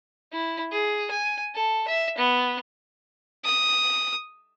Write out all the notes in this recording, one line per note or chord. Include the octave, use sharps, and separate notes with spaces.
E4
G#4
G#5
A4
E5
B3
D#6